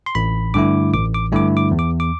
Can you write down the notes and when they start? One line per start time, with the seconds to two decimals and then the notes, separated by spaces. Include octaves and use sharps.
0.06 C6
0.15 A1 B5
0.54 G2 D3 A3 E4 D6
0.93 A1 D6
1.14 D6
1.32 G2 D3 A3 E4 D6
1.57 D6
1.71 E2
1.79 D6
2.00 D6